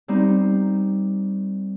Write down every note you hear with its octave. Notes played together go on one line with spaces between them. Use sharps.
G3 C4 D#4